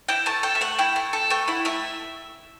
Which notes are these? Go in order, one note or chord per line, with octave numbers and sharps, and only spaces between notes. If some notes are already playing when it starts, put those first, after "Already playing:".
E4 G5
A3 A5
A4 G5
E5
A3 F#5
E4 G5
A3
A4
A3 G5
E4 F#5
A3 E5